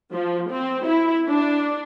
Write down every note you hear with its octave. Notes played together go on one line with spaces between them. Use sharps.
F3
C4
E4
D4